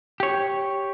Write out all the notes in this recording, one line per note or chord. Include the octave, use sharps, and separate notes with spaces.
G4 C#5